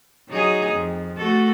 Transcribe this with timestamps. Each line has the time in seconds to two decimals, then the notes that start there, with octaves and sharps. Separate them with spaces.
0.29 F#3 D#4 G#4
0.72 F2
1.17 A3 F#4 A4